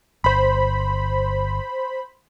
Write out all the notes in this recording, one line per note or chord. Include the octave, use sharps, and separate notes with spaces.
G1 C5 B5